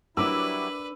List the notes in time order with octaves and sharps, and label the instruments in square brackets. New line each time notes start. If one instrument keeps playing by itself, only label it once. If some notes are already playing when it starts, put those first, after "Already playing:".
[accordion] F#3 G3 E4 [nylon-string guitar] D4 A#4 [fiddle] B4 [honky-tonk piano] D6 E6